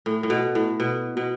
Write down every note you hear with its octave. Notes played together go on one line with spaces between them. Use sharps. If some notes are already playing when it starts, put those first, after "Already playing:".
A2
A2
B2
A2
B2
B2